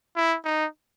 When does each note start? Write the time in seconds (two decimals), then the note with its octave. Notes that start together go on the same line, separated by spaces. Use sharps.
0.16 E4
0.45 D#4